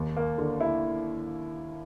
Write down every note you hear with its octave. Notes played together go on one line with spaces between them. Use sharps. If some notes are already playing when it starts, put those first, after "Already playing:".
Already playing: D#2
A#3
D3
E4